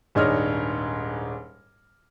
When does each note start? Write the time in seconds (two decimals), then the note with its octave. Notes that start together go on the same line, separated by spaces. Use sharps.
0.15 D#1 G#2 D4 C#5 D#5 F6